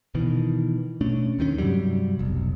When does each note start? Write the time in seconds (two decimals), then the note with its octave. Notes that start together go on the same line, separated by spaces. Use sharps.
0.15 B2 D#3 E3
1.01 B2 A3 C#4 D4
1.39 D#2 D#3 F3 C#4
1.58 G2 C3 F#3 G3
2.19 F1 B1